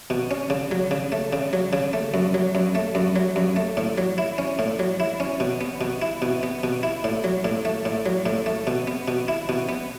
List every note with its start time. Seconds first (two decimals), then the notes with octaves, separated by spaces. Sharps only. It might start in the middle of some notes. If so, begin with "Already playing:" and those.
0.10 B2
0.31 C#4
0.50 C#3
0.71 F#3
0.91 C#3
1.12 A3
1.33 C#3
1.53 F#3
1.73 C#3
1.93 A3
2.14 F#2
2.34 F#3
2.55 F#2
2.75 A3
2.95 F#2
3.16 F#3
3.36 F#2
3.56 A3
3.77 A2
3.98 F#3
4.18 E4
4.38 C#4
4.59 A2
4.79 F#3
5.00 E4
5.20 C#4
5.40 B2
5.61 B3
5.81 B2
6.02 E4
6.22 B2
6.43 B3
6.63 B2
6.83 E4
7.04 A2
7.24 F#3
7.44 A2
7.65 A3
7.85 A2
8.06 F#3
8.26 A2
8.46 A3
8.67 B2
8.87 B3
9.08 B2
9.28 E4
9.49 B2
9.69 B3